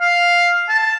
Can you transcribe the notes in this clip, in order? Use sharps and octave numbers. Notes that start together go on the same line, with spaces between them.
F5
A5